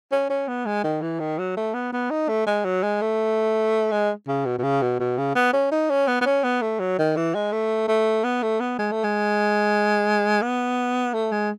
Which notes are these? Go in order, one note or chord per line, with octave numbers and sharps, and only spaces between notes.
C#4
C#4
B3
G#3
D#3
E3
D#3
F#3
A3
B3
B3
D#4
A3
G#3
F#3
G#3
A3
G#3
C#3
B2
B2
C#3
B2
B2
C#3
B3
C#4
D#4
C#4
B3
B3
C#4
B3
A3
F#3
D#3
E3
G#3
A3
A3
B3
A3
B3
G#3
A3
G#3
B3
A3
G#3